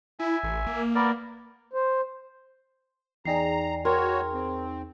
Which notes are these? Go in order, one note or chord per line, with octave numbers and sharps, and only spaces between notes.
E4 E5 G#5
A1
A#3
B3 A#4 D5
C5
E2 D#4 G#4 D5 G5 A#5 C7
F#4 A#4 C#5 G5 C6
C4